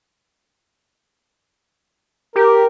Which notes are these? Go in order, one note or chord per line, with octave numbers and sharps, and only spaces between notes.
G4 A#4